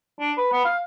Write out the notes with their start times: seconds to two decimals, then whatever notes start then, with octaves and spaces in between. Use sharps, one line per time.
0.20 D4
0.37 B4
0.52 B3
0.64 F5